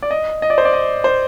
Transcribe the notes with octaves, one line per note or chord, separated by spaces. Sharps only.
D5
D#5
D#5
D5
C5
D5
D#5
C5